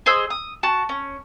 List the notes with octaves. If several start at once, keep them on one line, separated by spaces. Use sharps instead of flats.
G#4 C5 D#5 E6
D#6
F#4 A5
C#4